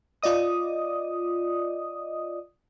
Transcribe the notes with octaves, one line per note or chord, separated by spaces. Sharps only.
F4 D5 D#5 D#6